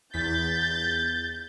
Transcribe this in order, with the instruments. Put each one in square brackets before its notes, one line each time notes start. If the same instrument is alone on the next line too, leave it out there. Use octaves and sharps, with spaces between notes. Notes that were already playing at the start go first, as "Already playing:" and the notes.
[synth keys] E2 B6 [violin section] G6 A6